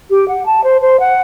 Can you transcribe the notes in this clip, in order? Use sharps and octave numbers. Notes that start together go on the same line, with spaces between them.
G4
F#5
A5
C5
C5
F#5